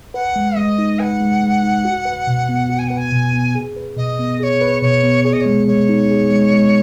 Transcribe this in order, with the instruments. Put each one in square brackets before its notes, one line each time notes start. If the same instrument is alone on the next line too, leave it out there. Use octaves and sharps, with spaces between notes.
[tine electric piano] B4 [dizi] F#5
[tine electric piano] G#3
[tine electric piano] G#3 [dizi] D#5
[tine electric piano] D#4
[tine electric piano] B4 [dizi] F#5 G#5
[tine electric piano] G#3
G#3
D#4
F#4
B4
B2
B3
F#4
[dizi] G#5
[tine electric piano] B4 [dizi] F#5
[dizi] G#5
[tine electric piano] B2
B3
G#4
B4
[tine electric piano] B2 [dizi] D#5
[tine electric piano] B3
[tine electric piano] G#4 [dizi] D#5
[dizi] C#5
[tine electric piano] B4
[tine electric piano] B2 [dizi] C#5
[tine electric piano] B3
[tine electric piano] G#4 [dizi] C#5
[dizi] D#5
[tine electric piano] G#3 [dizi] C#5
[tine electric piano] G#3 [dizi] C#5
[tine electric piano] D#4
G#4
G#3
G#3